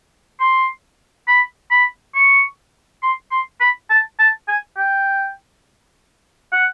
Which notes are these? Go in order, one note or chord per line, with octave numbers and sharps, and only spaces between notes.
C6
B5
B5
C#6
C6
C6
B5
A5
A5
G#5
G5
F#5